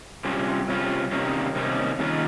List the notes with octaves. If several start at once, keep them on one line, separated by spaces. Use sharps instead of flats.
C3 G3 C#4 F4
C3 G3 C#4 F4
C3 D#3 G3 A#3 C#4
C3 D#3 G3 A#3 C#4
D#3 A#3 C#4 F4